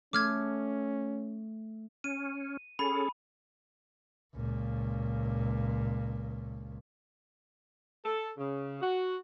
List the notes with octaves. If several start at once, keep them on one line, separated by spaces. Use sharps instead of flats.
A3 C#4 D6 F6 G#6
C#4 D#7
C#4 G#4 A4 B5
C#2 A#2
A4
C#3
F#4